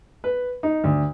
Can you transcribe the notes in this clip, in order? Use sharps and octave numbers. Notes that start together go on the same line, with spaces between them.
B4
D#4
D2